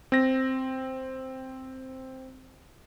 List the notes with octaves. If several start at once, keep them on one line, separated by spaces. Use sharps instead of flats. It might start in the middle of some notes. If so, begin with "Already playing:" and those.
C4 A#6